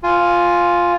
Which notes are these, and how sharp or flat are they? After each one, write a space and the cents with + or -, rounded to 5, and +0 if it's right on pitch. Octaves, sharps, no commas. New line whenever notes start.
F4 +0 G#5 +0